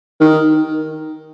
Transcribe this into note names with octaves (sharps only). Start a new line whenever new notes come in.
D#3